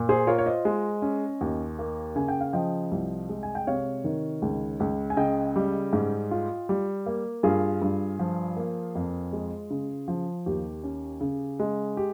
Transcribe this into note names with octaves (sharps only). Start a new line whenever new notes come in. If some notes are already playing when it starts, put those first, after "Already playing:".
Already playing: A#2
G#4 C5
F4 A#4 C#5
C#5
C5 D#5
G#3
C#4
D#2
A#3
C#3 G#5
G5
F5
F3 D#5 G5
C2
G#3
G#5
G5
C3 C#5 F5
D#3
C#2
C#2
G#5
C#3 D#5 G5
G3
G#2
F4
G3
A#3
G2 F4 G#4
G2
F3
A#3
F2
G#3
C#3
F3
D#2 G4
C#4
C#3
G#3
G4